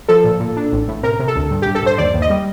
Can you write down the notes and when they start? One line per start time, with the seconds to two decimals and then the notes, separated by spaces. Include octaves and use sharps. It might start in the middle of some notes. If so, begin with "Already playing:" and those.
0.08 F3 A4
0.24 A#2
0.40 A#2
0.57 D4
0.72 A1
0.88 A2
1.03 C3 A#4
1.19 C3
1.28 A4
1.36 D2
1.51 G2
1.62 G2 G4
1.75 A4
1.83 G2 C5
1.98 D#2 D5
2.14 D#2
2.22 D#5
2.30 G3